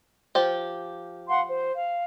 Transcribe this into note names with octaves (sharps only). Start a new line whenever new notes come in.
F3 G4
F5 F#5 C6
C5
F5